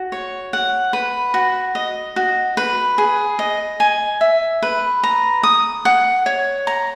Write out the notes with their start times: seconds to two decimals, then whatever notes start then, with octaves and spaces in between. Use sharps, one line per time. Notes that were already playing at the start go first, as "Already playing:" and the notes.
Already playing: F#4
0.12 C#5
0.53 F#5
0.93 B4
1.34 F#4
1.75 D#5
2.16 F#4
2.57 B4
2.98 G#4
3.39 D#5
3.80 G#5
4.21 E5
4.62 B4
5.03 A#5
5.43 D#6
5.85 F#5
6.26 C#5
6.67 A#5